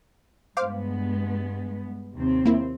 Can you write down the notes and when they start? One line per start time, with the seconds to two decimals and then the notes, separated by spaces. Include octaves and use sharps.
0.57 G2 G#3 B3 C5 F5 D6
2.15 D#2 C3 C4
2.46 A#3 E4